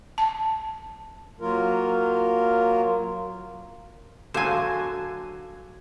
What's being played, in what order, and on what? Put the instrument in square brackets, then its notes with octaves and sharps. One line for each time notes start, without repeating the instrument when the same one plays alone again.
[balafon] A5
[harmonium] F#3 A#3 F4 A#4
[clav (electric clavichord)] D3 F#3 [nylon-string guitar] F#4 A4 F5 [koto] C5 G#5